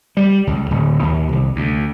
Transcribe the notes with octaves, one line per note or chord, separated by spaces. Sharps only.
G3
C#2
D1
D#2
C2
D2